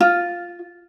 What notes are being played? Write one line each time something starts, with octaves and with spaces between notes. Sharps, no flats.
F4